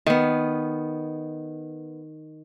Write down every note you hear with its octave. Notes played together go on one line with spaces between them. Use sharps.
D#3 B3